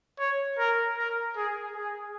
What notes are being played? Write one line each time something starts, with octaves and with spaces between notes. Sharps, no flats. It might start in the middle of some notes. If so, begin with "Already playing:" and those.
C#5
A#4
A#4
G#4
G#4